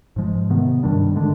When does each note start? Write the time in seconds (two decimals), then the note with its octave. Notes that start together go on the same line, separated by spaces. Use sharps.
0.16 G#2 F3 G#3
0.50 C3 D#3 B3
0.83 G2 D#3 G3 D4
1.16 D3 G#3 D4